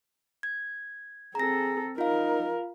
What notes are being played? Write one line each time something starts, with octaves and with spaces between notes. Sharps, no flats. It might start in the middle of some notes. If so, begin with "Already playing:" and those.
G#6
C4 G#4 A4 A#5 A#6
D#4 F4 A#4 F5